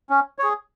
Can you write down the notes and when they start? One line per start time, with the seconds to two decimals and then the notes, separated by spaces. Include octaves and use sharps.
0.10 C#4
0.39 G#4 C#5